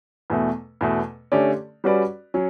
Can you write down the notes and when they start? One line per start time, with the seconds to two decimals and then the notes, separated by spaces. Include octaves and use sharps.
0.30 E2 B2 A3
0.81 E2 B2 A3
1.32 D3 A3 C#4 G4 D5
1.84 G3 C#4 F#4 B4 D5
2.34 F#3 C#4